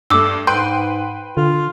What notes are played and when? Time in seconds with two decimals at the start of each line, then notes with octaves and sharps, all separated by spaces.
0.10 G2 A3 D6 E6
0.47 G#2 B4 G5 C6 G6
1.37 D3 F4